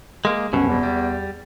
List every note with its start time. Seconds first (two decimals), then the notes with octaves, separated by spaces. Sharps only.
0.25 G#3 A#3
0.53 C2 F#2 B2 C#4
0.67 E2
0.83 G3